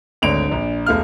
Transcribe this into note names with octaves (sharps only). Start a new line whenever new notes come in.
G#1 D2 C#5 D5 D7 F7
A#1 D4
E1 A3 F5 F6